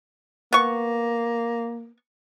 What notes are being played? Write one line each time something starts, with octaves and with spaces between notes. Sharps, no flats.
A#3 B3 C#6